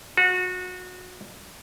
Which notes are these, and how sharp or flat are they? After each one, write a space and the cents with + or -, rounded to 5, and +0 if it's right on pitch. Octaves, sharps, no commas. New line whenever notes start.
F#4 -25